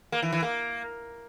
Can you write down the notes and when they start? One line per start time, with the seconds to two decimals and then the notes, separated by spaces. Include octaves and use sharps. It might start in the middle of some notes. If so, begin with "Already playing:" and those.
0.12 A#3
0.22 E3
0.32 E3
0.42 A#3